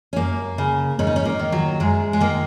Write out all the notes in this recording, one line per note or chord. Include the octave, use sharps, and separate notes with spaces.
C#4
F#2 A#3
C#3
G#2 C#4
D#4
C#4
A#3
D#3
F#3
F#2 G#3
G#3
D#3 A#3